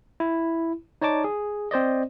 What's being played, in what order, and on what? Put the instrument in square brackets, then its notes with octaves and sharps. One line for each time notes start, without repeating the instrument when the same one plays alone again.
[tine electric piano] E4
D#4 C#5 D5 A5 D6
G#4
C4 C5 D5 D#5